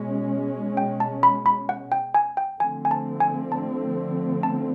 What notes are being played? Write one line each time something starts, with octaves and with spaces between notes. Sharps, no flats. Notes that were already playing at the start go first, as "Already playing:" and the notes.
Already playing: B2 G#3 C#4
G5
A5
B5
B5
F#5
G5
G#5
G5
D3 F3 A3 C4 G#5
G#5
A5
G#5
A5
A5